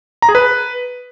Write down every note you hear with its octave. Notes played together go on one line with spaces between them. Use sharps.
A#5
G#4
B4